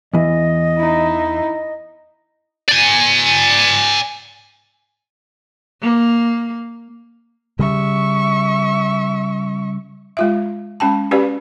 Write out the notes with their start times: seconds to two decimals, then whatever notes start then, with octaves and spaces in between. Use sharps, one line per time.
0.14 E2 E3 D#5
0.77 D#4 E4
2.69 D5 G#5
5.82 A#3
7.59 C#3 G3 E5 C#6
10.17 G#3 F4 E5
10.80 G#3 C#4 G5 A5
11.11 C#4 F#4 G4 B4 D5 F5